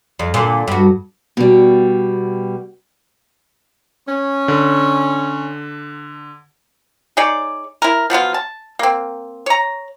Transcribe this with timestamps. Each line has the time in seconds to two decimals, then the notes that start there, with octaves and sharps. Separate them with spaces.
0.19 F2
0.34 A#2 D3
0.68 G2 F#4
1.37 B2 G3
4.09 C#4
4.48 D3
7.17 D#4 G#4 C#5 D5
7.82 E4 A#4
8.10 F3 F#3 B3 F4
8.34 A5
8.79 A#3 C4
9.46 C#5 A#5